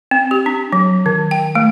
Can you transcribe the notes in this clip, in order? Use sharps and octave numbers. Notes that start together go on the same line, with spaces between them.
C4
G4
D4
F#3
D#3
G5
A3